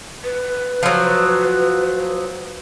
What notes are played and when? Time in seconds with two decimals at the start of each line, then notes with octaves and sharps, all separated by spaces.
0.24 B4
0.83 F3 F#3